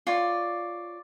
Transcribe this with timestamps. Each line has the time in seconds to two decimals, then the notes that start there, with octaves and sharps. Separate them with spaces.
0.07 F4 C#5 D5